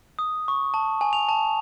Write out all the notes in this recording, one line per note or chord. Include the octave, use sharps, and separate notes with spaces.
D#6
C#6
A5
G#5
F7
A5